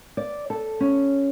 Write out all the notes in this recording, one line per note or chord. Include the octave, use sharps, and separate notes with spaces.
D5
A4
C#4